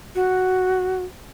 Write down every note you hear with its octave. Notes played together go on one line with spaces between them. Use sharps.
F#4